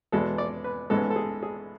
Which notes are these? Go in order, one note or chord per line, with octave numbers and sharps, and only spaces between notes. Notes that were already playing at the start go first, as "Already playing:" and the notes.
E2 B2 G#3 B3 A4
D5
B4
A1 G#2 G#3 B3 A4
A4
G#4
G#4